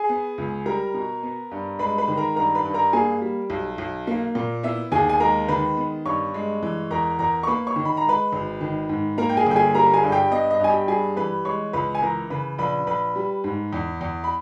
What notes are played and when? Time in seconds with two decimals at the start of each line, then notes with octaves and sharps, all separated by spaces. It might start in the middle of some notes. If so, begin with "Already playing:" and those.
Already playing: G#4 G#5
0.09 B3
0.38 C#2
0.66 G3 A#4 A#5
0.94 B2
1.23 B3
1.51 G2
1.79 G#3 B4 B5
1.98 B4 B5
2.08 D#3
2.17 A#4 A#5
2.36 G2 A#4 A#5
2.55 B4 B5
2.65 G2
2.74 A#4 A#5
2.93 A#3 G#4 G#5
3.22 G3
3.50 B1
3.78 B1
4.07 A#3
4.35 A#2
4.63 B3 E4 E5
4.92 D#2 G#4 G#5
5.09 G#5
5.20 G#3 A#4 A#5
5.48 D#3 B4 B5
5.77 B3
6.05 G2 C#5 C#6
6.34 G#3
6.63 E3
6.91 E2 A#4 A#5
7.19 E2 A#4 A#5
7.43 C#6
7.47 A#3 B4 B5
7.66 C#5 C#6
7.76 D#3
7.85 B5
7.97 A#5
8.04 G#3 B4 B5
8.32 G#1
8.61 D#3
8.89 G#2
9.18 A#3 A#4 A#5
9.29 G5
9.37 G#4 G#5
9.46 G1 G5
9.56 G#4 G#5
9.75 G3 A#4 A#5
9.94 G#4 G#5
10.03 G2
10.12 G4 G5
10.31 B3 D#5
10.51 D#5
10.60 G2 G#5
10.69 G4 G5
10.88 G3 G#4 G#5
11.17 E3 B4 B5
11.45 G#3 C#5 C#6
11.73 C#2 B4 B5
11.95 G#5
12.02 E3 A#4 A#5
12.30 C#3 B4 B5
12.58 A#1 B4 B5
12.87 A#1 B4 B5
13.16 G3
13.44 G#2
13.73 E2
14.01 E2
14.24 B5